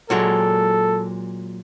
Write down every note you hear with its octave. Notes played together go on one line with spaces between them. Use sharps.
A#2 F#3 G#3 A4